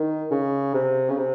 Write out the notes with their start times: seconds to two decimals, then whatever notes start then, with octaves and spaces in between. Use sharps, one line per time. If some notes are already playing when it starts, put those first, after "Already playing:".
Already playing: D#3
0.31 C#3
0.74 C3
1.09 C#3
1.17 C3